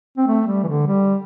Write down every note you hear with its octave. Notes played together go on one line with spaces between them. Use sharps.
C4
A3
G3
E3
D3
G3